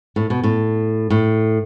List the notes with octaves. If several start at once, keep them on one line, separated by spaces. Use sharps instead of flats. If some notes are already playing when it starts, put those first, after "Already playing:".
A2
B2
A2
A2